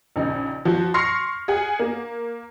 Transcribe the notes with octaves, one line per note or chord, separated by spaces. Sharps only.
A#1 C#3 D#4
F3 F#4
C6 C#6 F6 A#6 C7 C#7
G#4 F#5 G#5
A#3